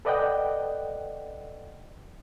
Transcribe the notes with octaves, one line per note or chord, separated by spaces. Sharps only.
A4 B4 D5 D#5 F#5 G5